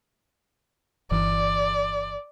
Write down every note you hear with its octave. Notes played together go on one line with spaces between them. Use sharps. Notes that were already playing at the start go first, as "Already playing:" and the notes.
G1 E3 D5